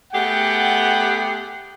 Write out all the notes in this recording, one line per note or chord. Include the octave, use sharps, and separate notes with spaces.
A3 B3 G4 G#4 F#5 G5